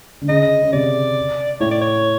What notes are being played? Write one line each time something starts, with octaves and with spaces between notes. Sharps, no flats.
D3
C#3 D#5
C#3
C3 D5
A2 C#5
D5
C#5